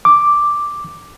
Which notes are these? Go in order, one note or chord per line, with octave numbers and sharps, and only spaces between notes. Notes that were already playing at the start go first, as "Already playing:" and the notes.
D6